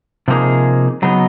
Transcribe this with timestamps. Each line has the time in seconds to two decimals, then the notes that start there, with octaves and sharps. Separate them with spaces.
0.28 C3 F3 A#3 D#4 G#4
1.02 C#3 F#3 B3 D#4